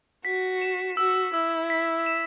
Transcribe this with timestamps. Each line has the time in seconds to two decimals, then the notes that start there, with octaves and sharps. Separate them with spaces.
0.25 F#4 B6
0.62 E7
0.97 F#4 E6
1.34 E4 E6
1.70 B6
2.06 E7